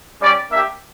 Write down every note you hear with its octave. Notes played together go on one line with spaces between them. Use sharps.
G3 C#4 G4 D5
A#3 D4 G4 E5